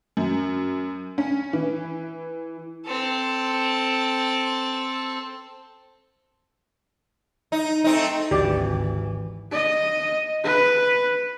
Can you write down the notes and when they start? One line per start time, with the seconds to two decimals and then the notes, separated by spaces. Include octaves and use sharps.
0.17 F#2
1.18 C#4
1.53 E3
2.86 C4 A4
7.52 D#4
7.84 A3 C4 D#4
8.31 G#1 D2 E3 G4 D5
9.51 D#5
10.44 B4